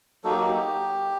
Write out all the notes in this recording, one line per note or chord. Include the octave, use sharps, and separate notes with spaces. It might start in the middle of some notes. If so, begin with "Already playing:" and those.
F#3 A#3 D#4 F#4 A4
G4
F#4
G4